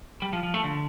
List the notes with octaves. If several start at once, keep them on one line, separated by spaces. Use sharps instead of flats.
G3
F3
F3
A3
D3